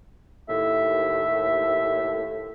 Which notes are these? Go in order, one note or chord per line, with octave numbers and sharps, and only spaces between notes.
D#2 A2 E5